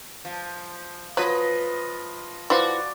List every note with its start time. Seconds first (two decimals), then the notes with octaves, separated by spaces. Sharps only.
0.25 F3
1.17 F3 F#3 B4 D#5 B5
2.50 E3 F3 F4 F#4 D5